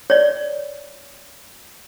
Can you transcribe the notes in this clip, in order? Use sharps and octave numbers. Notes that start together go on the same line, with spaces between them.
C#5 D5